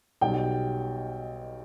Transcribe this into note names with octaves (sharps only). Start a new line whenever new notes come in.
B1 B2 G3 G5